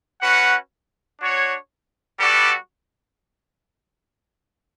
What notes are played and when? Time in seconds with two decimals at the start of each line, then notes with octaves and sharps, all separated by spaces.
0.21 C#4 F#4 B4 F#5
1.20 D4 F#4 C#5
2.20 G3 B3 F#4 A4 D5